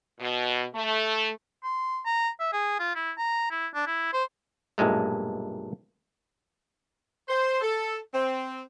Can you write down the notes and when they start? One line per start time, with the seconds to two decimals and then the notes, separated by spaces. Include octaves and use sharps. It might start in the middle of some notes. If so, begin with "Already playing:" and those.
0.20 B2
0.74 A3
1.64 C6
2.05 A#5
2.40 E5
2.53 G#4
2.80 F4
2.95 E4
3.18 A#5
3.51 E4
3.75 D4
3.87 E4
4.13 C5
4.78 B1 G2 A#2 G#3 A3
7.28 C5
7.61 A4
8.13 C4